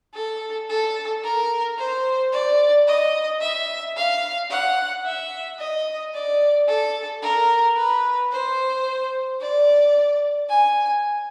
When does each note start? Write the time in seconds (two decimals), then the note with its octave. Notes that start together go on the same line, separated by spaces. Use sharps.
0.14 A4
0.69 A4
1.24 A#4
1.78 C5
2.32 D5
2.87 D#5
3.41 E5
3.96 F5
4.50 F#5
5.05 E5
5.59 D#5
6.14 D5
6.68 A4
7.23 A#4
7.76 B4
8.31 C5
9.40 D5
10.49 G#5